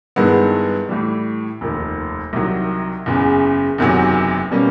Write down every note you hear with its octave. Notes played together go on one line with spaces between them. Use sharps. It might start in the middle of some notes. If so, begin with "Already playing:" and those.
G2 D#3 G#3 B3 E4
A2 E3 G3
F1 D#2 D#3
C2 C3 D#3 F#3
F#1 E2 C#3
F#1 E2 C3 D#3 F#3
B2 G3 A#3 C#4